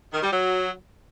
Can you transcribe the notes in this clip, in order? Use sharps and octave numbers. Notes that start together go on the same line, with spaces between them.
D#3
G3
F#3